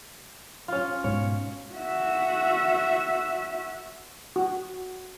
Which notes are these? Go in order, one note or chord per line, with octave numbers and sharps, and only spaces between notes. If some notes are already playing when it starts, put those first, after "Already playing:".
C#4 F4
G#2 B2 C#5
F#4 E5
F#4